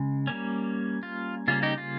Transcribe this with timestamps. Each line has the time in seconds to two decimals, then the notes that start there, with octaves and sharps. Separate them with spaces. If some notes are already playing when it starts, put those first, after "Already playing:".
Already playing: C#3 G#3
0.27 G3 A#3 C#4
1.03 F4
1.48 C#3 G3 A#3 C#4 F4
1.63 D#4 G4
1.78 F4